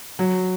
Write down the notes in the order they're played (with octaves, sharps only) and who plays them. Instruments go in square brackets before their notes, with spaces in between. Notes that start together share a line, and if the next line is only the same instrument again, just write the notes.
[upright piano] F#3